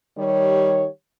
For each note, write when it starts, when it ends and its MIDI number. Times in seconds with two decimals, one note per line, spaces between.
0.18 0.87 51
0.18 0.87 55
0.18 0.87 67
0.18 0.87 73